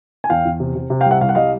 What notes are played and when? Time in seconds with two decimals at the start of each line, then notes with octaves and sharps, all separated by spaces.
0.24 G#5
0.29 E2 F5 G5
0.45 E2
0.60 C3
0.75 C3
0.90 C3
1.01 F5 G5
1.06 C2
1.11 E5 F#5
1.21 C2 F5
1.29 F#5
1.35 G3 D#5 F5